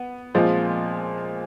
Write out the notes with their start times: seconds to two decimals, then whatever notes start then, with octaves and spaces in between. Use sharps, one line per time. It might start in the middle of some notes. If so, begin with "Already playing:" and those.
Already playing: B3
0.34 A#2 F3 G#3 C4 F4